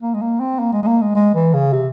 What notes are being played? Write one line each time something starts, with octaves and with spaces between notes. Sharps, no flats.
A#3
G#3
A#3
C4
A#3
G#3
G#3
A#3
G#3
G#3
E3
C#3
C3